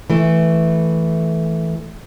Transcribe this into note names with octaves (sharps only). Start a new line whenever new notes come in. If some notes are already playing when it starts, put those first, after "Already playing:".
E3 A3